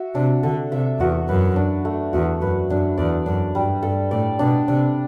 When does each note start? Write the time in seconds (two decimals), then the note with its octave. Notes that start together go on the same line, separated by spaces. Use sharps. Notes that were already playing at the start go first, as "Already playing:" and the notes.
Already playing: F#4 E5
0.15 C3 D4
0.43 D3 A4
0.71 C3 E5
1.00 E2 F#4
1.28 F#2 B4
1.56 D4
1.85 A3
2.13 E2 F#4
2.41 F#2 B4
2.70 F#2 D4
2.98 E2 D5
3.26 F#2 D4
3.55 G2 G3
3.83 G2 A4
4.11 A2 D5
4.39 B2 D4
4.68 C3 D4